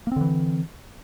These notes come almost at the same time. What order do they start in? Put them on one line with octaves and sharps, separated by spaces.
A#3 C4 D3 E3